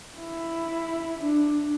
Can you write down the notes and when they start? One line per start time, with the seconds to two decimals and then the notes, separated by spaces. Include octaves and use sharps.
0.17 E4
1.19 D4